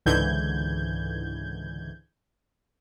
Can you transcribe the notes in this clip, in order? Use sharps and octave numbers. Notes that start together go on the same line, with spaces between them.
C#2 G#2 D3 E3 G6 G#6